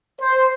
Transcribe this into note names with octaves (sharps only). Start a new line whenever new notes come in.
C5